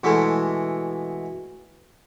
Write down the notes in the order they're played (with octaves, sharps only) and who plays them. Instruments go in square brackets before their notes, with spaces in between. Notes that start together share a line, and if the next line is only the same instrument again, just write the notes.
[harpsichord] B2 E3 G#3 A3